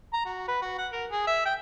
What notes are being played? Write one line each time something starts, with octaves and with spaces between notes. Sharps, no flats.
A#5
F#4
B4
F#4
F#5
A#4
G#4
E5
G5